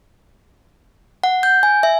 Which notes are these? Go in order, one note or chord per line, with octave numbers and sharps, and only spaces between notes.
F#5
G6
G#5
E5